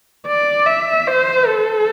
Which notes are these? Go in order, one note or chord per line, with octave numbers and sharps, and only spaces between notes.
D5
E5
C5
A4